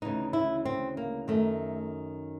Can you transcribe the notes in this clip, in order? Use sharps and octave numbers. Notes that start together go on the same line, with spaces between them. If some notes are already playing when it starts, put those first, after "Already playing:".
D2 C#3 E3 D#4
E4
C4
A#3
F#2 D#3 A3